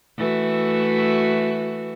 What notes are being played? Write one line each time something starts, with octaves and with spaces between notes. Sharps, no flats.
E3 A3 F#4